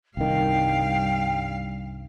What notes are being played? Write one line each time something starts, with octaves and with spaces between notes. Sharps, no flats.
C2 G2 D#3 F5 G5